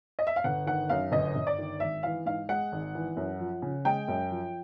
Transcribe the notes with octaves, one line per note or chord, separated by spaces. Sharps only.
D#5
E5
F5
G1 F#5
D#3 F#5
F#2 F5
G1 D#5
G1
D5
D#3
G#1 E5
E3 F5
G#2 F5
G#3 F#5
G#1
E3
F#2
F3
C#3
G#3 G5
F#2
F3